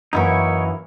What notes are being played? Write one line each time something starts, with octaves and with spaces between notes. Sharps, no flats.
F#2 E3 A#3 D#4 E4 C#5